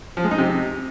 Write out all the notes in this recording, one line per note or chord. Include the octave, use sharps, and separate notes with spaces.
F3
G#3
D#4
C3